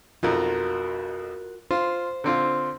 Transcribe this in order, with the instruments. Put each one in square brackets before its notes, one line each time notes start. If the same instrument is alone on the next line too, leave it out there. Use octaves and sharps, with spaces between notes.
[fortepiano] B1 F2 [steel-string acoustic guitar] F4 F#4 A#4
[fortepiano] F4 [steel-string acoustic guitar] C5
[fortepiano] D3 C4 F4